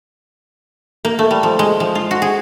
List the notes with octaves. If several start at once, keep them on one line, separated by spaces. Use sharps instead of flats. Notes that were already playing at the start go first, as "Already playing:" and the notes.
A#3
A3
G3
F3
G#3
F3
F4
F#4
G#4